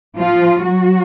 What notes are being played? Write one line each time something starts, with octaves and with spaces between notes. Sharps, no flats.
F3 F4
F#3 F#4